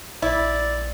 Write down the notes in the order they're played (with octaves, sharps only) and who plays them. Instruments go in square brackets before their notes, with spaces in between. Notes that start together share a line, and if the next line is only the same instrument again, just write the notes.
[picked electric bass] A#1 [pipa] E4 [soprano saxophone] D5